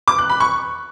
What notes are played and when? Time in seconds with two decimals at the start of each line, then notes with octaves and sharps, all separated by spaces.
0.08 D6
0.19 F#6
0.29 B5
0.40 C#6